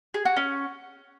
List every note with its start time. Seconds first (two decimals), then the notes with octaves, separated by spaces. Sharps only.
0.14 G#4
0.25 F#4
0.36 C#4